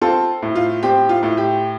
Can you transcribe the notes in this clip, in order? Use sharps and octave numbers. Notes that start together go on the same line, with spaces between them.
C4 F4 A4
A2
F4
C4 G4
F4
A2
G4